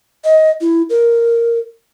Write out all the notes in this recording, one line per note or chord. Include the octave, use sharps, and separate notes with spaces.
D#5
E4
A#4